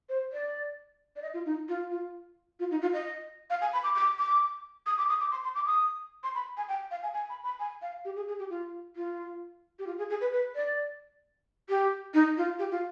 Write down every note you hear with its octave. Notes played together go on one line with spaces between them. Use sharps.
C5
D5
D5
D#5
F4
D#4
F4
F4
F4
D#4
F4
D#5
F5
G#5
B5
D6
D6
D6
D#6
D6
D#6
D6
C6
C6
D6
D#6
C6
B5
G#5
G5
F5
G#5
G#5
B5
B5
G#5
F5
G4
G#4
G#4
G4
F4
F4
G4
F4
G#4
G#4
B4
B4
D5
G4
D#4
F4
G4
F4